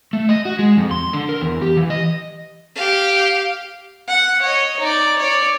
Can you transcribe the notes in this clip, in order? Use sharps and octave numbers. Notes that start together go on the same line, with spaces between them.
A3
D#5
F#4
G#3
F2
C6
D3
A#4
E2
G4
E3
D#5
G4 F5
F#5
C#5 D#5
D#4 D5
C#5 D5